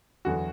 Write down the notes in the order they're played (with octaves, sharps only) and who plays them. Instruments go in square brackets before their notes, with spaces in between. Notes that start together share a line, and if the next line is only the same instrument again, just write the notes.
[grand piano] E2 D3 F#3 F#4